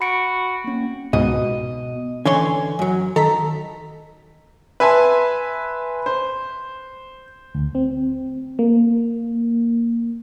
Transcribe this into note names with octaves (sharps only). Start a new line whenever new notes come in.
F#4 B5 C#7 D7
A#3 C#4
C#2 G#2 B2 D#5
D3 E3 C#4 C#5 G#5 C6
F#2 F#3
D#3 A4 A#5 B6
B4 E5 G#5 A5 C6
C5
D2
C4
A#3